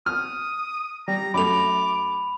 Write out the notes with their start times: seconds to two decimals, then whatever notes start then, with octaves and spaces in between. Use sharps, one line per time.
0.06 D#6 F6
1.08 G3 A#5
1.34 F#2 A3 B5 D6 F7